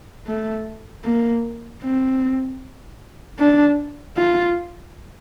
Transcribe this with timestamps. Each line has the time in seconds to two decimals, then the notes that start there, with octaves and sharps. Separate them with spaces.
0.27 A3
1.04 A#3
1.83 C4
3.39 D4
4.17 F4